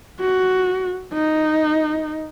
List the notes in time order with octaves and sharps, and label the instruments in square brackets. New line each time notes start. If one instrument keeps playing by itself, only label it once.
[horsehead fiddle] F#4
D#4